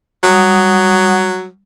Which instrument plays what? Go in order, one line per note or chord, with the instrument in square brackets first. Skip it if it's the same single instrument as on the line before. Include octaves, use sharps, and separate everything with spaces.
[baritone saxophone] F#3 [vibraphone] G3 F#5 D#6